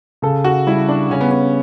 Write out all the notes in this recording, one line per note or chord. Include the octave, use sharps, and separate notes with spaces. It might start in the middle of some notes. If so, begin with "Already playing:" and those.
C#3 A4
F#4
G3 E4
D4
C#3 C#4
B3
C#4